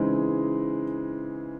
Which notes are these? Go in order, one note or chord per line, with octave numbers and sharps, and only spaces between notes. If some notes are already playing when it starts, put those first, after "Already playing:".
Already playing: C#3 E3 G#3 C4 D#4